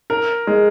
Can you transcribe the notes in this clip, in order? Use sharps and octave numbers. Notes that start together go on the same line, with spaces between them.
A#4
G#3